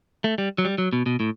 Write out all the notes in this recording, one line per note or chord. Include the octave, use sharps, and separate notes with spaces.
A3
G3
F#3
G3
F#3
B2
B2
A2